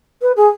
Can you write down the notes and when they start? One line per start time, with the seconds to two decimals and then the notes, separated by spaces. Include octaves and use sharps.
0.22 B4
0.37 G#4